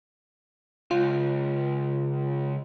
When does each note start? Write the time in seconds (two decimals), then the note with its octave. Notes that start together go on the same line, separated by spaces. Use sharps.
0.91 C#2 F4